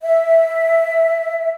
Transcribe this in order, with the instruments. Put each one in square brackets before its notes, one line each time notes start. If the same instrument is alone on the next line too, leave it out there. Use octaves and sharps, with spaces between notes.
[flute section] E5